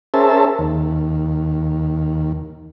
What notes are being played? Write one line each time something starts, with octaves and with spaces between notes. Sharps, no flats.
C#4 G#4 A#4 C5 E5 A5
D#2